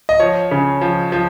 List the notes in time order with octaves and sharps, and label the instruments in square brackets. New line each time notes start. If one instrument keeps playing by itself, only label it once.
[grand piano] D#5
F3 C#5
C#3
F3
F3